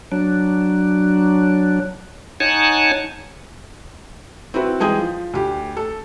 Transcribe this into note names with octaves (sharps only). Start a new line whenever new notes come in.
F#3 D4
D#4 C#5 F#5 G#5 A5
C4 E4 F#4 B4
E3 G#3 G#4 G5 G#5 G6
F3
D2 G4
A4